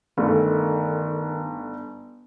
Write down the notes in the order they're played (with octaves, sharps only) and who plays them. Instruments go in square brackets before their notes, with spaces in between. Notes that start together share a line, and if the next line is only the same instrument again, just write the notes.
[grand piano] G1 A3 [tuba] D#3